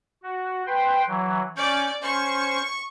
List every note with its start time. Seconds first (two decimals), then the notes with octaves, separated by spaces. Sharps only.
0.23 F#4
0.67 B4 G5 C6
1.08 E3 F#3
1.57 C#4 D5 C#6 D6 G6
2.02 C#4 C5 C#6